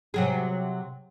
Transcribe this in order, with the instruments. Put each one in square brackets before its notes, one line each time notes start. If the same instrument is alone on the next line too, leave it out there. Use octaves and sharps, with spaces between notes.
[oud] C3 F#3 G#4